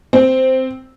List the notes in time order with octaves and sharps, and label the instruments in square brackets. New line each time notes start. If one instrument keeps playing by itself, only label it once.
[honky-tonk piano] C4